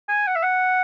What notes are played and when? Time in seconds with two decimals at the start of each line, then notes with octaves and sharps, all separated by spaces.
0.09 G#5
0.27 F#5
0.35 E5
0.43 F#5